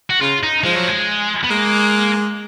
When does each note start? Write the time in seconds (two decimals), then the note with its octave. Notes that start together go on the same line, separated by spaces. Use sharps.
0.10 F#4
0.21 C#3 F4
0.43 D#4
0.64 F3 G#3
0.76 F#3
0.88 G#3
1.44 B3
1.50 G#3 A#3